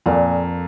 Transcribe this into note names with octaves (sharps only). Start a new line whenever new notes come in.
F2 A#2